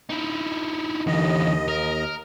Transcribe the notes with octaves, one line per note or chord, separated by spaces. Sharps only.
D#4 E4
D#2 D3 E3 D#5
A#4